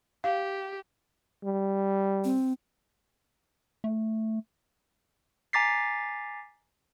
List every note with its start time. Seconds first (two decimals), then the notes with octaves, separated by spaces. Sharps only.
0.24 G4 F5
1.44 G3
2.24 C4
3.84 A3
5.53 G#5 A#5 D6 A6 B6 C7